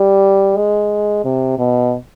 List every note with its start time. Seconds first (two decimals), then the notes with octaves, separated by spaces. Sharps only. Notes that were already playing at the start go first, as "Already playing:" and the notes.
Already playing: G3
0.57 G#3
1.24 C3
1.59 B2